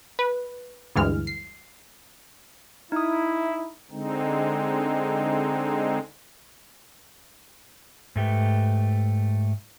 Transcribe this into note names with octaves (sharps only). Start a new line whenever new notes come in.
B4
D2 G2 E3 G#3 F6
C7
D#4 E4 D#6
D3 G#3 C4 D#4
G#2 A3 G4 B4